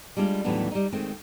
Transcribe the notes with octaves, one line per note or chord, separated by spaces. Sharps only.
G3 G#3 D4 E4 F4
D#2 A2 E3 F#3 B3 D4
G3 D#4
D#3 G#3 A3 C4